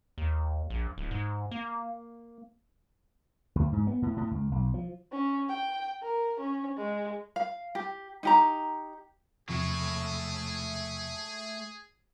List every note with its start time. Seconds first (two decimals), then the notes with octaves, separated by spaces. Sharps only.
0.18 D#2
0.70 A#1
0.98 D1
1.11 G#2
1.51 A#3
3.55 D2
3.73 G#2
3.87 B3
4.02 A2
4.17 A2
4.31 C#2
4.51 B1
4.74 F3
5.12 C#4
5.49 G5
6.02 A#4
6.40 C#4
6.77 G#3
7.36 F5
7.75 G4
8.23 D#4 G4 A#5
9.49 E2 C3 F3 A3 G#4 C#5